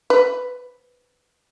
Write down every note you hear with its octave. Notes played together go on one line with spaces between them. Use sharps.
B4